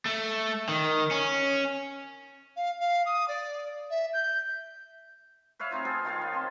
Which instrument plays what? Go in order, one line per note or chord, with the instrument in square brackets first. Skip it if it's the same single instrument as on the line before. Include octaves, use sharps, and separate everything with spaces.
[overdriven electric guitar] A3
D#3
C#4
[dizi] F5
F5
D#6
D5
E5
G6
[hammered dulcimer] B4 C#5 E5 F5
A3 C4 D#4 F4
B3 G#4 A4
D#3 F4 F5 C#6
B4 C#5
C4 A5 C6